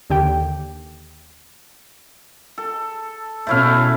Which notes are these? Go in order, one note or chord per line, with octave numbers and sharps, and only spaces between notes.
D#2 D3 G4 G5
A4
B2 A3 C#4 E4 F5